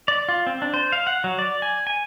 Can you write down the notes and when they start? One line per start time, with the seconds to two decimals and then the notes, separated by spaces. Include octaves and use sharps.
0.08 D5
0.29 F4
0.47 C4
0.62 D4
0.74 C5
0.92 F5
1.07 F#5
1.24 F#3
1.39 D5
1.62 G#5
1.87 G#5